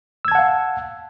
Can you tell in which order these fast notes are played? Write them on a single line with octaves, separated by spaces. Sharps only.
E6 G#6 A5 F#5 F5